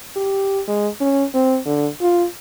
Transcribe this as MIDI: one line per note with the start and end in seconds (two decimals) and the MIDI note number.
0.16 0.61 67
0.68 0.88 56
1.00 1.24 61
1.34 1.58 60
1.66 1.87 50
2.01 2.25 65